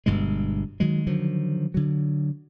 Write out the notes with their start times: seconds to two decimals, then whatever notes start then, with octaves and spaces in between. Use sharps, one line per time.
0.06 G1 G2 B2 G#3
0.80 D#3 F#3 G#3
1.07 D3 D#3 F3 F#3
1.74 D3 F#3